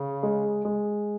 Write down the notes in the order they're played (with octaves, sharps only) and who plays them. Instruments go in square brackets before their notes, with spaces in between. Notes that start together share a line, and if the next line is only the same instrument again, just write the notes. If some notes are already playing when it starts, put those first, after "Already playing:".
Already playing: [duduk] C#3
[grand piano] G#3
G#3